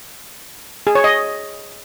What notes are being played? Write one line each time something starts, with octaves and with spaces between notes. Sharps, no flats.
G#4
C#5
D#5